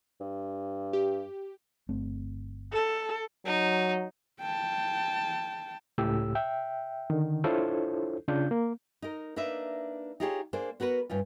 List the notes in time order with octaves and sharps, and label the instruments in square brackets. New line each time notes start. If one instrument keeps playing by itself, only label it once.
[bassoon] G2
[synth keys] G4
[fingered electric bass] G1 A3 C4
[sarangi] A4
[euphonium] F#3 [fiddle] D#4
[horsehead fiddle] G5 A5
[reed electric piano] C#2 A2 G4 E6
E5 G5
D3 D#3
D4 E4 F4 A4 C5 C#5
C#3 D4 F4 G6
A#3
[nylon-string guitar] D#4 A#4
A#3 D4 D#4 B4 E5
D#4 F4 G4 G#4 C5 C#5
A#3 D4 G#4 C5
B3 F#4 A#4 B4
D2 G2 C#4 F4